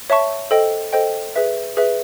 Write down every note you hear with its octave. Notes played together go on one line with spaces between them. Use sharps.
C#5 E5 A5 C#6
A4 C5 D#5 G5
A4 C5 D#5 G5
G#4 B4 E5
G#4 B4 E5